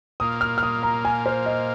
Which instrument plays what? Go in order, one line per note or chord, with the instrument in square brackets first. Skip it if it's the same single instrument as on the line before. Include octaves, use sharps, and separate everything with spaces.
[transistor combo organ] A#2 A#3 F4 [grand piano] D#6
[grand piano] F6
F6
D#6
A#5
G#5
C5
D#5